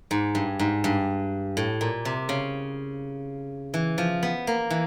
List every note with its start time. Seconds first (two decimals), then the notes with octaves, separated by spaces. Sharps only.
0.11 G#2
0.35 G2
0.59 G#2
0.84 G2
1.57 A2
1.81 A#2
2.05 C3
2.29 C#3
3.74 E3
3.98 F3
4.23 B3
4.47 A#3
4.70 E3